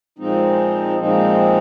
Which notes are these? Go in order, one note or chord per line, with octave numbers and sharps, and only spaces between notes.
A#2 F3 G#3 C4 D#4
A#2 F3 G#3 C4 D#4